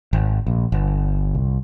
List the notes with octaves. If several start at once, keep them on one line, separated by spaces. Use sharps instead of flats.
G#1
A#1
G1
C2